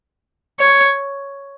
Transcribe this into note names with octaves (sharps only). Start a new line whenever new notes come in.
C#5